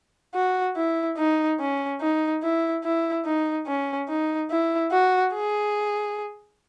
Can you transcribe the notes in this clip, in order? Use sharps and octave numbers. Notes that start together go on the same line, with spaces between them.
F#4
E4
D#4
C#4
D#4
E4
E4
D#4
C#4
D#4
E4
F#4
G#4